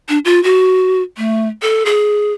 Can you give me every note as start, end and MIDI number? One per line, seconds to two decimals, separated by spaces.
0.09 0.19 62
0.25 0.42 65
0.44 1.02 66
1.17 1.48 57
1.62 1.83 69
1.86 2.33 68